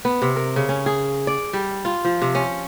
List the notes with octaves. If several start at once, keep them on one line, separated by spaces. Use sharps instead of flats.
B3
C3
A#4
C#3
C#4
G#4
D5
G3
F4
F3
C3
C#4